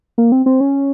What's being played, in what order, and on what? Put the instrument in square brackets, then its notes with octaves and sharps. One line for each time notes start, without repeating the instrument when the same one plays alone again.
[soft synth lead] A#3
C4
C4
C#4